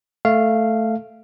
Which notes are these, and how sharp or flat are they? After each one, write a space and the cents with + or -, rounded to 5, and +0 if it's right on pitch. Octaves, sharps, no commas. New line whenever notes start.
A3 +0 F5 -10